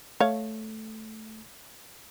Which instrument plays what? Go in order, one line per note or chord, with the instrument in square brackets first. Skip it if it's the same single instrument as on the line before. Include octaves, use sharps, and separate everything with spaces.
[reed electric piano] A3 [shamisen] C#5 F5